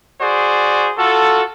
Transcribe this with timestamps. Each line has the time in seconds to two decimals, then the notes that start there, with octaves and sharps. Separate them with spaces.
0.21 F#4 G#4 C5 D5
0.98 F4 F#4 A4